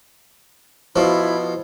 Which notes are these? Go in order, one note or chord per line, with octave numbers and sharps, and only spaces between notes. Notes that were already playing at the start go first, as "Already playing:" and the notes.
B2 F3 E4